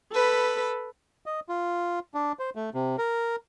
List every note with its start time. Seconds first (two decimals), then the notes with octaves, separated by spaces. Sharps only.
0.14 A4 B4 B5
1.26 D#5
1.49 F4
2.14 D4
2.39 C5
2.56 A3
2.74 C3
2.98 A#4